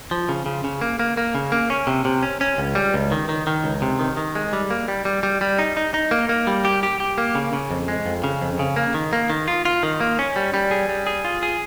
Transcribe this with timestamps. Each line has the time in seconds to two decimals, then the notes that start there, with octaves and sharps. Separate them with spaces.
0.11 F3
0.29 C#3
0.46 C#3
0.64 C#3
0.81 A#3
0.99 A#3
1.17 A#3
1.35 C#3
1.52 A#3
1.70 C#4
1.87 C3
2.05 C3
2.23 C#4
2.41 C#4
2.58 C#2
2.75 G3
2.94 C#2
3.12 D#3
3.29 D#3
3.47 D#3
3.64 C#2
3.82 C3
4.00 D#3
4.17 D#3
4.35 G#3
4.53 G3
4.70 A#3
4.88 G3
5.05 G3
5.23 G3
5.41 G3
5.59 D#4
5.77 D#4
5.94 D#4
6.11 A#3
6.29 A#3
6.47 G3
6.65 G4
6.83 G4
7.00 G4
7.18 A#3
7.35 C#3
7.53 C#3
7.71 F2
7.88 G#3
8.06 F2
8.24 C#3
8.42 F2
8.59 C#3
8.76 A#3
8.94 D#3
9.13 A#3
9.30 D#3
9.48 F4
9.65 F4
9.83 D#3
10.01 A#3
10.19 C#4
10.36 G3
10.54 G3
10.71 G#4
10.89 G3
11.07 G#4
11.25 F4
11.43 G#4